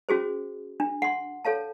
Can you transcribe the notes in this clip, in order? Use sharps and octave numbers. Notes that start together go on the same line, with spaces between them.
C#4 F#4 G#4 C5
D4
F#5 C6
A4 C#5 F5 A5